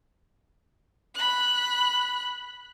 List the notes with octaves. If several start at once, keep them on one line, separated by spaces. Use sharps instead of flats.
B5 F#6